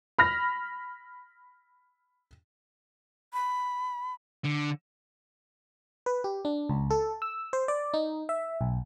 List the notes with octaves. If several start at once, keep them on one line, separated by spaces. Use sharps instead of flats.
B5 F6 A#6
B5
D3
B4
G4
D4
C#2
A4
E6
C5
D5
D#4
E5
B1